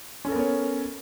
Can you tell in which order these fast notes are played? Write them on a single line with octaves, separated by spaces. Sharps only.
C#4 A4 A#4 B3 C#5